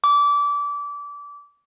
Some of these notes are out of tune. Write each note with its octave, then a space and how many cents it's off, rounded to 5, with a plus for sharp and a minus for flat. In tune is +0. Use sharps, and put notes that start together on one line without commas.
D6 -25